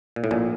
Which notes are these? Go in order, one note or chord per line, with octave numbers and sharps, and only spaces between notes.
A#2
A2
A#1 A#2